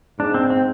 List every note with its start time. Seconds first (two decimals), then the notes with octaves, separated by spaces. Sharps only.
0.19 G#2 D4
0.34 C4
0.50 C4